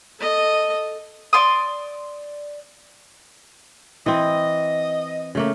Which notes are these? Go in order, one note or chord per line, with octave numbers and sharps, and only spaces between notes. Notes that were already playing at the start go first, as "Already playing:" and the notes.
A4 D#5
D5 C6 D#6
E3 C4 D#5
C#3 A3 A#3